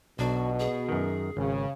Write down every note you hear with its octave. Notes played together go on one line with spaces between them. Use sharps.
B1 B2 D4 F#4
G#4
F#2 D#3
G#1 C#3